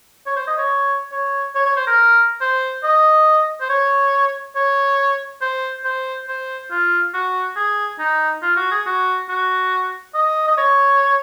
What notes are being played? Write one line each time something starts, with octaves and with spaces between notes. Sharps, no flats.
C#5
C5
D#5
C#5
C#5
C#5
C#5
C5
A#4
C5
D#5
C5
C#5
C#5
C5
C5
C5
F4
F#4
G#4
D#4
F4
F#4
G#4
F#4
F#4
D#5
D#5
C#5